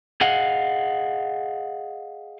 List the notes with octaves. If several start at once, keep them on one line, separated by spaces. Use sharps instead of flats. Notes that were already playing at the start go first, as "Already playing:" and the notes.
G#4 D#5 F5 F#5